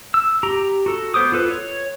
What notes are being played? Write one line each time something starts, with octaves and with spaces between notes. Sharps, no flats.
E6
G4 A#5
F#4 A4
B3 C5 D6 D#6
F4 A4 B4
C#5